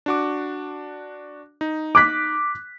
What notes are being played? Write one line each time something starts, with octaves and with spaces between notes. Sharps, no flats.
D4 F#4 D6
D#4
D6 F#6 B6